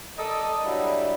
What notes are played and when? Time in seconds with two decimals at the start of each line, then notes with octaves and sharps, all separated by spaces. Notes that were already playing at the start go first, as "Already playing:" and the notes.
0.17 A4 A#4 D5 D#5
0.64 F#3 G3 D4 E4